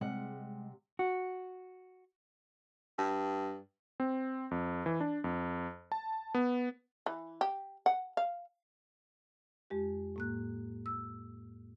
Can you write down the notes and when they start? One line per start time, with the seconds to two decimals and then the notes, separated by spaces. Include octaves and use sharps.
0.01 C3 G3 G#3 F#5
0.99 F#4
2.99 G2
4.00 C4
4.51 F2
4.86 E3
5.00 D4
5.24 F2
5.92 A5
6.34 B3
7.06 E3
7.41 G4
7.86 F#5
8.17 F5
9.70 F2 G#3 G4
10.16 A2 A#3 F#6
10.86 E6